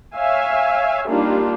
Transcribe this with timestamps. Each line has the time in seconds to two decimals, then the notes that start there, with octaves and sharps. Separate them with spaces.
0.15 C#5 E5 F5 G#5
1.08 G3 A#3 D4 D#4 F4 G4